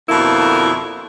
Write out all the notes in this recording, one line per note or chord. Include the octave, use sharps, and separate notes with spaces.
F2 B2 D3 A#3 E4